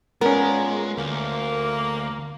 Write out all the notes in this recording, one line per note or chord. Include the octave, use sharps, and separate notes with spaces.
A#2 G#3 B3 C#4 A#4
D2 A#3